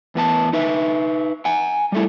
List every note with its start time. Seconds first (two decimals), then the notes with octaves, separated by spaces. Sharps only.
0.15 E2 B3 A5
0.53 D#4 B4 E5
1.45 F#5 G#5
1.92 G3 A3 E4